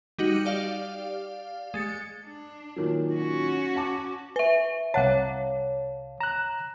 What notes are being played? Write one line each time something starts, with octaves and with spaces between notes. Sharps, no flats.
G3 D#4 F#4
G4 D5 F5
G#3 A6 C#7
D4
A#2 D#3 F#3
C#4 F#4
F#5 A5 D6
B4 E5
C2 C#5 F5 F#5 A5
A#5 F#6 E7